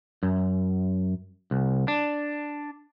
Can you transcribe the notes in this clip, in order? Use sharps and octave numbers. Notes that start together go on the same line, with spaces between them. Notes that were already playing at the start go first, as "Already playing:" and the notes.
F#2
C2
D4